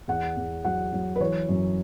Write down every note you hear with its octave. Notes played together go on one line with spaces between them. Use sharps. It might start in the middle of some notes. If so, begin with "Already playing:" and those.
E2 F#5
E2
F#3 F#5
F#3
B4
E3 C#5
F#2